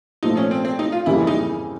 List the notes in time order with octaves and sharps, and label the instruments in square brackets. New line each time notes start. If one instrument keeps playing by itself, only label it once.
[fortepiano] A#2 F3 A3 [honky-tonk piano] D#4
[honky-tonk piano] C#4
C4
C4
D#4
F4
[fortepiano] F2 C#3 E3 G3 A#3 [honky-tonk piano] E4
[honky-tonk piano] D#4